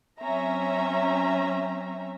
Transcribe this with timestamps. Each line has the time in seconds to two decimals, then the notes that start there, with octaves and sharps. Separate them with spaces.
0.21 F#3 C4 C#4 E5 A#5